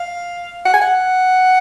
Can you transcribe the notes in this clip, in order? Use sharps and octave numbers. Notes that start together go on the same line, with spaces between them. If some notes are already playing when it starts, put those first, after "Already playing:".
Already playing: F5
F#5
G#5
F#5